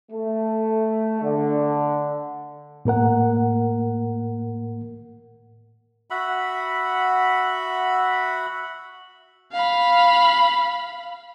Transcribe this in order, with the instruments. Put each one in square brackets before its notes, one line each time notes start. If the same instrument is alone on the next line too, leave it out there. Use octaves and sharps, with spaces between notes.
[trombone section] A3
D3
[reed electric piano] A2 A#3 A#4 F#5
[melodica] F#4 E5 F#5 B5
[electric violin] F5 B5